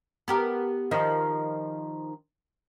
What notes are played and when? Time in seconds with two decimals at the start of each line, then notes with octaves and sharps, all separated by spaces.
0.28 B3 G4 A#4
0.91 D#3 F3 D#4